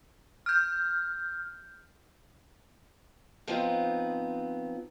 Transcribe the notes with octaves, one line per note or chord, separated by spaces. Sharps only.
F6 G6
F3 B3 C4 D#4 F4